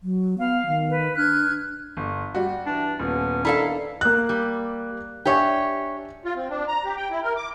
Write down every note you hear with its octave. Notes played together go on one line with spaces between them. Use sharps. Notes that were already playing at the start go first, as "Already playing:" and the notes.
F#3
B3 F5
D#3
B4
D4 F6 F#6 G#6
G1
G3 F#4
E3 D4
D#1 B3 C#4
D#3 D4 E4 A4 F5 A#5
A#3 F#6
G3
D4 G4 C#5 E5 G#5
F4
C4
D4
A#5
G4
G5
E4
A#4
D6